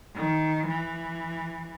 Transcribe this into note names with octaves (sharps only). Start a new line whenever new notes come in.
D#3
E3